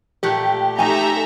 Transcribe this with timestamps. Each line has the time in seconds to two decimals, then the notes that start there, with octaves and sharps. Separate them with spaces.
0.23 A#2 A3 G4 F#5
0.79 A3 D#4 A4 E5 G#5 A#5